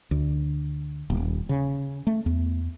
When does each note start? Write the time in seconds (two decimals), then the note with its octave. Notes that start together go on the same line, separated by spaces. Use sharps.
0.11 D2
1.10 D#1
1.49 C#3
2.07 A3
2.26 E2